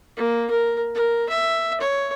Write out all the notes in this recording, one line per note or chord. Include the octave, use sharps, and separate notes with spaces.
A#3
A#4
A#4
E5
C#5